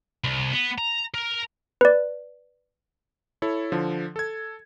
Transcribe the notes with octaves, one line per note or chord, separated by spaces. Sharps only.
C2
B3
A#5
A#4
B4 D5
E4 A4 C#5
D3 F3
A4 G#6